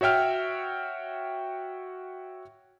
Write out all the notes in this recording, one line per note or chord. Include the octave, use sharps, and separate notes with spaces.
F#4 C#5 E5 G5 F6